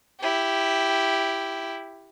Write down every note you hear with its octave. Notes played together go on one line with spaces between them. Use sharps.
E4 G4